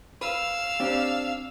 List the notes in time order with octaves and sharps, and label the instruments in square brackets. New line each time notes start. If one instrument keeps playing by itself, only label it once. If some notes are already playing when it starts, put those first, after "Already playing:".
[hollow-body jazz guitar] B4 [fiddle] F5 E6
[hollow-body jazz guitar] C4 D4 G4